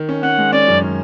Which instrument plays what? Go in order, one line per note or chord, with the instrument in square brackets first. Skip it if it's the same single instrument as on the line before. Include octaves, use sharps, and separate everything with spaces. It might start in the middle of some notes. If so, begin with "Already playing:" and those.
Already playing: [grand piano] D#3
C#4
[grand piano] C#4 [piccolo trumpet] F#5
[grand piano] G#3
[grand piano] C#4 [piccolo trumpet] D5
[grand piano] F#2
D#3